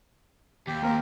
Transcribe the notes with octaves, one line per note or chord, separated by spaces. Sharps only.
D#2 G4
A#3 C4 A#4